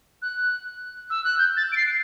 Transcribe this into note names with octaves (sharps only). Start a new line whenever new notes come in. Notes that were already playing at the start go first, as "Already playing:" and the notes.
F#6
E6
F#6
G6
A6
D7
C7